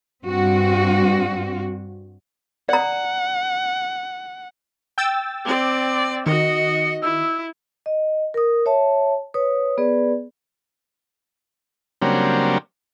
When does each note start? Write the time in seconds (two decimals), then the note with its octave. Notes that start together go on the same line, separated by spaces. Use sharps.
0.24 G2 C4 F#4
2.69 D5 F#5 A#5
4.98 G5 E6 A6
5.45 C4 D5 D6
6.26 D#3 F#4 D#5 C#7
7.02 E4 E6
7.86 D#5
8.34 A#4 D#6
8.66 C#5 E5 A5
9.34 B4 C#5 D#6
9.78 B3 G#4 B4 D5
12.02 C#3 F#3 G3 A#3 C4 D4